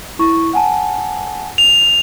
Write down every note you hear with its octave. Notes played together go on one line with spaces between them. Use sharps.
E4 C#6
F#5 G#5 A5
F7